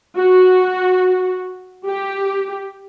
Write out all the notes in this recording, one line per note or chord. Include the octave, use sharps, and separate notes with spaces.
F#4
G4